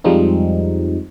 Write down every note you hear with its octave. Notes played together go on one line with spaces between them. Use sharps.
F2 F3 G3 G#3 C4 D#4